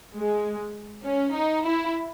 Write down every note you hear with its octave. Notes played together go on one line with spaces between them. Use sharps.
G#3
C#4
D#4
E4